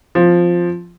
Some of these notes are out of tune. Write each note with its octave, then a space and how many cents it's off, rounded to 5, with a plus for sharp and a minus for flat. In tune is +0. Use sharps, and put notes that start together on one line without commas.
F3 +0 C4 +5